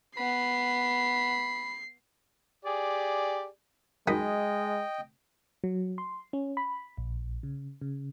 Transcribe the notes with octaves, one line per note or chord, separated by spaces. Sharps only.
B3 B5 C7
G4 G#4 D5
F#2 G#3 D#4 D#5 G5 B5
F#3
C6
C#4
B5
A#1
C#3
C#3